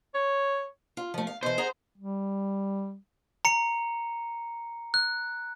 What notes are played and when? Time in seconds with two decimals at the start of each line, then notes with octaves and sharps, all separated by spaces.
0.15 C#5
0.97 F4
1.14 F3 A3
1.27 F5
1.43 B2 E3 C5
1.58 G#4 F#5 A#5
1.98 G3
3.45 A#5 C#7
4.94 F#6